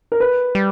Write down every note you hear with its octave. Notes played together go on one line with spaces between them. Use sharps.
A#4
B4
G3